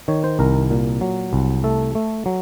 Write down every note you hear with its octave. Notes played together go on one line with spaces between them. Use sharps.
D#3 C#5
C5
C2 A#4
A#2
F#3
C2
A3 A4
A3
F#3